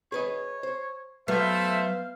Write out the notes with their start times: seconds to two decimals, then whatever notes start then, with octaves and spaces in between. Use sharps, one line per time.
0.12 G#4 B4 C#5 D#5
0.63 C5
1.28 F#3 A3 B3 C5 E5 F5